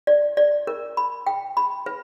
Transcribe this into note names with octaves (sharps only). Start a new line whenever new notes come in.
D5
D5
A#4
B5
G5
B5
B4